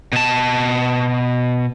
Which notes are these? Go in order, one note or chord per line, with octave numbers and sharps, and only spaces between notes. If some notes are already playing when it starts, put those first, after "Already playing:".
B2 A5